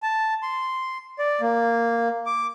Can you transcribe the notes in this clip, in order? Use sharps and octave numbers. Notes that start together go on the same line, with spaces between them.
A5
C6
D5
A#3
D6